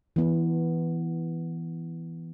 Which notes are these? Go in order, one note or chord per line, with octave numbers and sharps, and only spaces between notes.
E3 B3